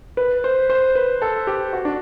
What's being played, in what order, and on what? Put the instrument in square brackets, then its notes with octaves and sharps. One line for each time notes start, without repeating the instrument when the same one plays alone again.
[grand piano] B4
C5
C5
B4
A4
G4
F#4
D4